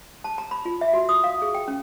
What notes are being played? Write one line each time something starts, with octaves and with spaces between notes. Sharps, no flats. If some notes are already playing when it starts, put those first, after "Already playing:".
A5
A#5
B5
F4
E5
F#4
D#6
F5
G#4
G5
C#4